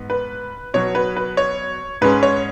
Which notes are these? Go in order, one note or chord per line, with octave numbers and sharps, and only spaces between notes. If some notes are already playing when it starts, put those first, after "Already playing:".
Already playing: G#2 B3
B4
B2 F#3 B3 C#5
B4
B4
C#5
G#2 G#3 C#4 B4
C#5